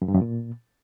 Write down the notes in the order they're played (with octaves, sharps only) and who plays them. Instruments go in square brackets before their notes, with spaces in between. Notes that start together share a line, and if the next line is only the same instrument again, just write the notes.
[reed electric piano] F#2
G2
F#2
A#2